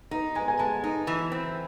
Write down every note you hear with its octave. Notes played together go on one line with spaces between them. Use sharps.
D#4 A#5
G#3 G#5
G#5
G#3 A5
D#4
E3
C4